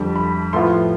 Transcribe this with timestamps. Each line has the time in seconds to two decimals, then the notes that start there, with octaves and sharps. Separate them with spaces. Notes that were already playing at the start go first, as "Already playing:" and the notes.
Already playing: F2 D3 G3
0.16 B5
0.53 A2 F3 B3 F4 C6